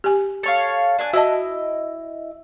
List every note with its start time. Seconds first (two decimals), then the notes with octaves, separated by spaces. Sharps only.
0.04 G4 G#5
0.43 A4 C#5 F5
0.99 D4 G#5 F#6
1.13 E4 F#4 D#5 A5